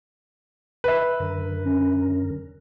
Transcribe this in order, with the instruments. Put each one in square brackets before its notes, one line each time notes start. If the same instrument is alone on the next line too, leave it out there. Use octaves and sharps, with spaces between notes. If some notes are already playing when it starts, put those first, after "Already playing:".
[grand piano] B4 E5
[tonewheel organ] F#2 D3 A#4
[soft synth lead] C#4